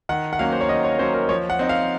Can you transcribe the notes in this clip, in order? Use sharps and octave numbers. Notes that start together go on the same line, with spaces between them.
D#3 F#5
F#5
F#3 A#3 C#4 F5
C5
C#5
D#3 D#5
C#5
F#3 A#3 C#4 C5
A#4
F3 C#5
F#5
C4 D#4
F5